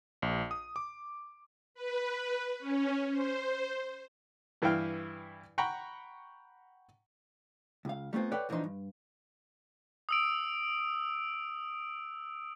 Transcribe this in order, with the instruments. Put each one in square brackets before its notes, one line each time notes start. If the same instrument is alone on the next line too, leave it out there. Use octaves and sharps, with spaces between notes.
[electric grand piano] A#1
D#6
D6
[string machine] B4
C#4
C5
[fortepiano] G2 E3 E4 F5 G5 F6
F#5 G5 A#5 B5 C#6
[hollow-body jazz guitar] C#2 F5
G3 A3 B3 C4 F4
A4 B4 C#5 D5 F#5 G5
E2 E3 F3 D4 D#4 C6
G2
[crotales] D#6 E6 D7